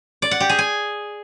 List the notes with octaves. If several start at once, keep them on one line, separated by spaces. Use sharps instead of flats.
D5
F#5
G4
G#4
G#5